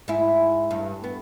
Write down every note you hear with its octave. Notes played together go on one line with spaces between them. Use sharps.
G#2 E4
G2
B3